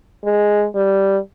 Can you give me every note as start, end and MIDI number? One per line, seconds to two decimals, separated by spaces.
0.25 0.66 56
0.75 1.17 55